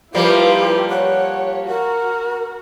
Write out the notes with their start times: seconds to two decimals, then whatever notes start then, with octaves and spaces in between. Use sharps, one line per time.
0.15 F3 G3 A#3 E4 F4 G4 B4
0.89 C#5 F#5
1.68 F#4 A#4